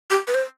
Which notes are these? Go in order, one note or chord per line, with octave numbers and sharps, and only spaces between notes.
G4
B4
C5